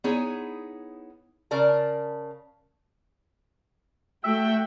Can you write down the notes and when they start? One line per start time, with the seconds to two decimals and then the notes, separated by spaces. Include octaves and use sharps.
0.04 B3 D#4 E4 G#4 C#5
1.51 C#3 A#4 D5 A5
4.24 A3 F#4 E5 G5